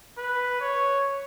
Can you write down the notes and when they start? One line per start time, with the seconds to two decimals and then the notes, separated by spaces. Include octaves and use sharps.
0.18 B4
0.61 C#5